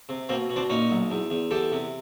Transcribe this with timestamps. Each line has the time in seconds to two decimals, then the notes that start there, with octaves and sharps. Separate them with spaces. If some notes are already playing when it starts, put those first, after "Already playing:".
0.09 C3
0.29 B2 A#3 C4
0.50 B2
0.56 C4 D4
0.70 A#2 C#4 D#4
0.91 B1
1.10 E2
1.30 E2
1.51 E2 G4 A4
1.72 C3